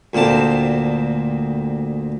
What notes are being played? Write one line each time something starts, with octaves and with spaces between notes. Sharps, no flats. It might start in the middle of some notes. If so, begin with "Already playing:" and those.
D2 A#2 C4 A5